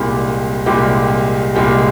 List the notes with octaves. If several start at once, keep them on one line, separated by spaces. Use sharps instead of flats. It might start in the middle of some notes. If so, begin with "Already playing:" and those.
Already playing: C2 A#2 G#3 C4 G4
C2 A#2 G#3 C4 G4
C2 A#2 G#3 C4 G4